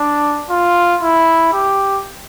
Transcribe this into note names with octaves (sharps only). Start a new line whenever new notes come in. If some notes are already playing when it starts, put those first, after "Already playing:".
Already playing: D4
F4
E4
G4